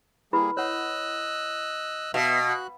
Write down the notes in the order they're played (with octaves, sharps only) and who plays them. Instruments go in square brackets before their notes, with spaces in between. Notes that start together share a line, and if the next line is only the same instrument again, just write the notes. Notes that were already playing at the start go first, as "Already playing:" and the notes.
[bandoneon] G3 A#3 G#4 [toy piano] E4 B4 B5
[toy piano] C#5 F#5 [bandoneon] D#5 E6 F#6
[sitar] B2 [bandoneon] B3 E5 [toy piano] F5
[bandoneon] F#4 F#6